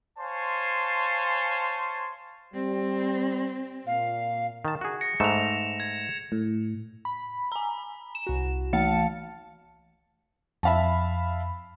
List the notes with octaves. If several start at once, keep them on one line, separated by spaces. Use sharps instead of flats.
C5 C#5 F5 G#5 A5 C6
G3 C4
A#2 F5
D#3 A5
F#4 G#4
A#6 C#7
G#2 A3 B4 E7 F7
G#6
A2
B5
G#5 A#5
E7
C2 F#4
E3 A3 F5 A5 C#7
F2 E5 F5 A5 B5